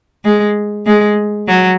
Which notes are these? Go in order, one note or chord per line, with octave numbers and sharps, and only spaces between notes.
G#3
G#3
F#3